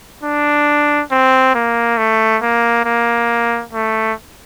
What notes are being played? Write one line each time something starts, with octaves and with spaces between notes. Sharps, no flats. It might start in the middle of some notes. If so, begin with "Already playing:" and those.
D4
C4
A#3
A3
A#3
A#3
A3